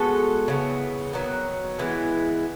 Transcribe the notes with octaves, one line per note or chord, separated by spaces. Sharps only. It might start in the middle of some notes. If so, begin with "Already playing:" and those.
Already playing: G#3 B3 F#4 A4
C#3 E3 B3
D#3 F#3 B3
E3 G#3 B3 E4